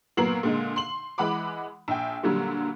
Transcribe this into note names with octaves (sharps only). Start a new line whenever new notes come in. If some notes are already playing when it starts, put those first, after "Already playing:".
A#2 F#3 B3 A#4 C7 F#7
A#2 D3 G#3
C6 F#7
E3 G#3 F#5 B5 D6
A#1 G5
A#2 D3 F#3 G3